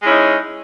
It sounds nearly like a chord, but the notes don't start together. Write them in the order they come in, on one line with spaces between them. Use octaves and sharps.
G#3 C#4 E4 D#4